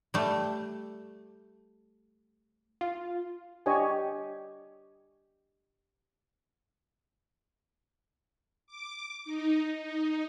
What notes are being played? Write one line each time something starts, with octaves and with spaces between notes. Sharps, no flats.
G3 A3
F4
D4 G4 C#5 D#5 G#5
D6
D#4
D#4